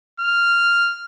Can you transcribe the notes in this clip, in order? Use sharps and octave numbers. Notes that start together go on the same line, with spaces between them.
F6